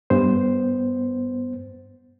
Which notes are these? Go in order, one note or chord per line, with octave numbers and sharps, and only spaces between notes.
G2 B3 C5